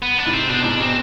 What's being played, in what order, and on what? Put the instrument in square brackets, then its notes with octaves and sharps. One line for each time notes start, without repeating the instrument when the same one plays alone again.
[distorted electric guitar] B3
D4
[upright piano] G#2 C3
[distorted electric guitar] C4
[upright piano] B2 [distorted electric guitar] D4
[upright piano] G#2 [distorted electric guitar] D4
[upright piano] B2 [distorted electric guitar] C4